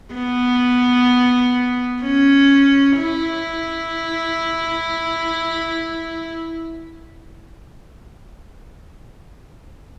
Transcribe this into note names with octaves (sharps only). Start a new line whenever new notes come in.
B3
C#4
E4